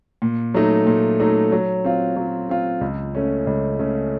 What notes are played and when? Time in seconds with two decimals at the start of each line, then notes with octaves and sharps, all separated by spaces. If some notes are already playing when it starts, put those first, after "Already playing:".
0.22 A#2
0.54 F#3 A3 D#4
0.87 A#2
1.20 F#3 A3 D#4
1.52 F#3
1.85 C4 F4
2.16 F#3
2.49 C4 F4
2.81 C#2
3.15 C#3 A3 C#4
3.47 C#2
3.79 C#3 A3 C#4